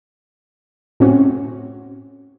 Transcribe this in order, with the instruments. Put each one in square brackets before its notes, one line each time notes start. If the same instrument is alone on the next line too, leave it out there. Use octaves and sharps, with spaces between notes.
[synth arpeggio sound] A2 C4 C#4 F#4